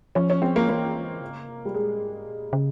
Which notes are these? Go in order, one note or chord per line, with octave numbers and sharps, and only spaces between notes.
F3 C#4
C#4
C4
A#3
E3 A#3
C#3
C3
G3
A#2 G#3
G#2
A#2
C#3